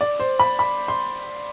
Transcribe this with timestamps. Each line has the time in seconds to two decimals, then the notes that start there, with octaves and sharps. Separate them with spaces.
0.01 D5
0.20 C5
0.39 B5
0.59 B5
0.88 C6